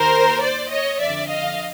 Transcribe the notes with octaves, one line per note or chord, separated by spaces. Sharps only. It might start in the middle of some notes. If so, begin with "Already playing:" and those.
Already playing: D#2 A#4 C5
C5 D5
C#5 D#5
F2 D3 D5 E5
D#5 F5